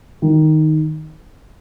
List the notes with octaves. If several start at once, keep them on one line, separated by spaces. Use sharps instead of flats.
D#3